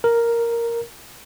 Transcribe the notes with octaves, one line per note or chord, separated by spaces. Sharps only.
A#4